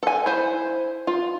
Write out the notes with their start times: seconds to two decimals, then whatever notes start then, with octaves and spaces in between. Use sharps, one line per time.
0.03 A4 G#5
0.26 E4 C5
1.07 F4